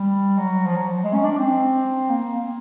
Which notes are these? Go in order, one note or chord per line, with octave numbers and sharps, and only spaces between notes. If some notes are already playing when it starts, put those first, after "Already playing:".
Already playing: G3
F#3
F3
F#3
G#3
C#4
D4
C4
A#3
A#3